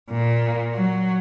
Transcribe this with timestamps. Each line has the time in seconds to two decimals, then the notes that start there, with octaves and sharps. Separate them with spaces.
0.11 A#2
0.74 F#3